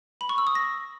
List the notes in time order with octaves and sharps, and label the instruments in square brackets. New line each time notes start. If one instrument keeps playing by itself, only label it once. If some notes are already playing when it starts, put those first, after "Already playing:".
[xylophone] B5
C#6
E6
D#6
A#6